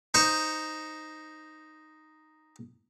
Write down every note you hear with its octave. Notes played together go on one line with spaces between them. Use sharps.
D#4 C5 C#6 D#6